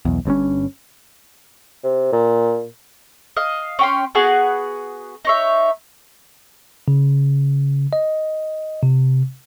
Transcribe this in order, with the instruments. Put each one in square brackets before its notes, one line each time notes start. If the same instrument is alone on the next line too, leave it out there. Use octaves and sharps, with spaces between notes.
[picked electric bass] B1 E2
G1 G2 C4 C#4
[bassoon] C3
A#2
[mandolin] D#5 F5
C#4 G5 C6
B3 F#4 G#4 G#5
D#4 C#5 E5
[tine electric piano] C#3
D#5
C3